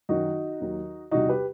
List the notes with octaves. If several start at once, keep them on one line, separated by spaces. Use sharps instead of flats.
F#2 D#3 F#3 D#4 F#4
D#2 D#3 F#3
E2 C3 E3 G3 D#4 F#4
G4 B4